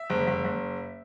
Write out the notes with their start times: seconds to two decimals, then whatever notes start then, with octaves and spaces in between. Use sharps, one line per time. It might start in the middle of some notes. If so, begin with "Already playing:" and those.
Already playing: E5
0.10 F#1
0.27 F#1
0.44 F#1